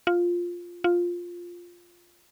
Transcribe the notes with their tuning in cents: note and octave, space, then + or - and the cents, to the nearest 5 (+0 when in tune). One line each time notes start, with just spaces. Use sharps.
F4 +5
F4 +5